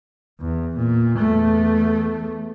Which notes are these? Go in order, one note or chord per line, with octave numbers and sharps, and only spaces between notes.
E2
A#2
E2 A3